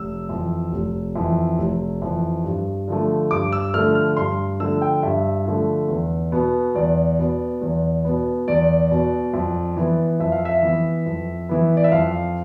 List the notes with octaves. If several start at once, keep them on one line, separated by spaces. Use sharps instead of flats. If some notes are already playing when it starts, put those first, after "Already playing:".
Already playing: F1 E6
F2 E3
F1
F2 E3
F1
F2 E3
G2
D3 F3 A3
G2 D6
E6
D3 F3 A3 F6
F6
G2 C6
D3 F3 A3 E6
G5
G2 E5
D3 F3 A3
E2
B2 B3
E2 D5
B2 B3
E2
B2 B3
E2 D5
B2 B3
F2
E3 B3
F2 E5
F5
E5
E3 B3
F2
E3 B3
D5
E5
F2 F5